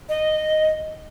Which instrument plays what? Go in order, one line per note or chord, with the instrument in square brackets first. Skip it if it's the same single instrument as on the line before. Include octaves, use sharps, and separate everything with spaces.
[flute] D#5